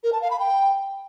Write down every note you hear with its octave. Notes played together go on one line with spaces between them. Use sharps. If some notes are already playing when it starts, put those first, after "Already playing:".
A#4
A5
F5
B5
G5